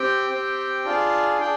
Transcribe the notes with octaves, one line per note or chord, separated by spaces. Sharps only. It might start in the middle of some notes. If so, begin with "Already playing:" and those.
Already playing: C4 G4 G5
C4 G4
D4 F4 G#4
D4 G#4 G5